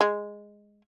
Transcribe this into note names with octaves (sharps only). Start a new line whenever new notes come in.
G#3